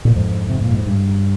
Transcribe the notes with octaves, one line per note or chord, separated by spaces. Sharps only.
A#2
F2 G#2
C3
A#2
G#2
G2